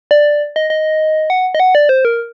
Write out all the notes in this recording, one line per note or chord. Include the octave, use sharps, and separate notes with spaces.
D5
D#5
D#5
F#5
D#5
F#5
D5
C5
A#4